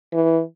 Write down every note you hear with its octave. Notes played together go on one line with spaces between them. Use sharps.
E3